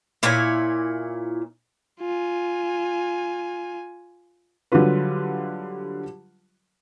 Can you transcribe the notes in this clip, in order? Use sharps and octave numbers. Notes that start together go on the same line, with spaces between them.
A#2 E4 C#5 G#5
F4 G#5
D3 F#3 G3 F4 B4